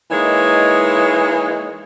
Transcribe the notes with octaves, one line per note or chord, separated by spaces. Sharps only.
E3 G#3 A#3 D#4 C#5